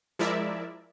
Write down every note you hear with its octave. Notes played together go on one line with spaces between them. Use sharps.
F3 G#3 E4 A#4 D5 E5